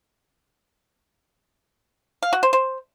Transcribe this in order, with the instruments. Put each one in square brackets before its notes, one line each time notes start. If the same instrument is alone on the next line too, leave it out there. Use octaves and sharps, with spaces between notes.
[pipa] F5
F#4
C5
C5